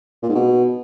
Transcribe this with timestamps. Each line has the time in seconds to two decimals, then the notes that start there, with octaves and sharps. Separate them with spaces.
0.23 A#2
0.29 G#2
0.35 B2